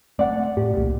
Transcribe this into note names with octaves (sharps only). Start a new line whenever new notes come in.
A3 C4 D5 F#5
A2 G4
C2 A#2